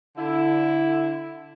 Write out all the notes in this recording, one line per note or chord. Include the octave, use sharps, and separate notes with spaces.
D3 E4